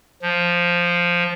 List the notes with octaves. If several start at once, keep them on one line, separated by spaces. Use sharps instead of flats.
F3